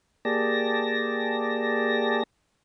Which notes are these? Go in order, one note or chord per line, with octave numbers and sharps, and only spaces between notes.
A#3 G4 G#4 D5 A5 A#6